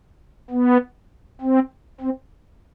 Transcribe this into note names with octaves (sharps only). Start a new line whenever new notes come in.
B3
C4
C4